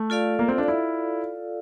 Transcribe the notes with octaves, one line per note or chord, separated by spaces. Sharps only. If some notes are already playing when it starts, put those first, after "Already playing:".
Already playing: A3
F4 A4 D5 F5
A#3
C4
D4
E4